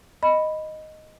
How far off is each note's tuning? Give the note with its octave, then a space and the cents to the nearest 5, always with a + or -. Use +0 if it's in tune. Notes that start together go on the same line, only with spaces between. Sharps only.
D#5 +0 B5 +0